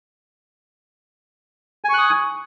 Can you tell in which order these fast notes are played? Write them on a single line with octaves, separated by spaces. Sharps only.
G#5 C#6 F#6 D#6